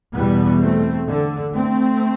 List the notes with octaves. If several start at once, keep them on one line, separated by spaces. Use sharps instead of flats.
E2 B2 G3 B3
A3 C4
D3
A3 C4